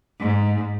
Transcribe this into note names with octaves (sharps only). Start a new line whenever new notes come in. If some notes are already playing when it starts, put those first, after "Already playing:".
G#2